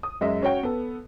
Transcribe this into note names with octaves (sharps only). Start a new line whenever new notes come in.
D#6
F#2 G#3 D#5 E5
C#4 F#4 C#5 G5
B3 A4